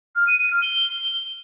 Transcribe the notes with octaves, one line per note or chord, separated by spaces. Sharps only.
F6
D#7
D#7
F6
G7